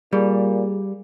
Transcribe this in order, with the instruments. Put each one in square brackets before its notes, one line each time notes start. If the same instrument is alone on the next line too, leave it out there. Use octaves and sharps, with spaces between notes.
[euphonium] A#2 [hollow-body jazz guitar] G3 [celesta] G#4 D5